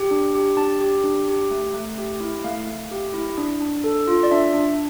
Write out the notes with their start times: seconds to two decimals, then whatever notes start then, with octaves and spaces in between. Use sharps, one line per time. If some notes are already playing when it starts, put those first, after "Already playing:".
Already playing: G4
0.11 D4
0.35 G4
0.57 D4 A5
0.81 G4
1.04 D4
1.28 G4
1.51 A3
1.74 A3
1.98 G4
2.20 E4
2.44 A3 F5
2.67 A3
2.91 G4
3.14 E4
3.38 D4
3.61 D4
3.84 A4
4.08 F4
4.23 D5
4.31 D4 E5
4.54 D4